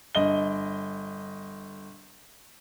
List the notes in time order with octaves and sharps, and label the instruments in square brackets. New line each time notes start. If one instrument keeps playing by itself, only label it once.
[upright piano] G1 D#5 G7